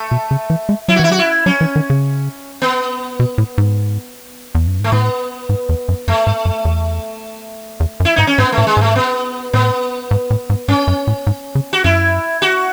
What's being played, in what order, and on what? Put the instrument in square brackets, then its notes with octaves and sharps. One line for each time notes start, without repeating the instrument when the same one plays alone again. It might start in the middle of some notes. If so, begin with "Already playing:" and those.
Already playing: [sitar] A3
[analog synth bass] B2
C#3
E3
G#3
[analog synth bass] F#3 [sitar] E4
[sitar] F#4
[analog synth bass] E3 [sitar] E4
[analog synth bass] F#3 [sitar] F#4
[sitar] E4
[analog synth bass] F#3 [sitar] C#4
[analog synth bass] E3
D#3
C#3
[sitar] B3
[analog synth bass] B2
A2
G#2
E2
F#2
[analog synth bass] G#2 [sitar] A3
[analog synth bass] A2 [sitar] B3
[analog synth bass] G#2
E2
F#2
[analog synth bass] F#2 [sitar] A3
[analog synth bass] G#2
F#2
E2
E2
F#2
[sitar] E4
[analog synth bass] G#2 [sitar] D#4
[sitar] C#4
[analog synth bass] G#2 [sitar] B3
[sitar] A3
[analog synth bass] A2
[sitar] G#3
[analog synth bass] G#2 [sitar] A3
[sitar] B3
[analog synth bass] A2 [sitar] B3
[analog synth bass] G#2
A2
G#2
[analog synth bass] G#2 [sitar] C#4
[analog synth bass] F#2
A2
G#2
C#3
[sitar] F#4
[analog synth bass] F#2 [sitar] E4
[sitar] F#4